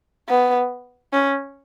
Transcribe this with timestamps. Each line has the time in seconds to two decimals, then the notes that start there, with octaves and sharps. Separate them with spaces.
0.29 B3
1.13 C#4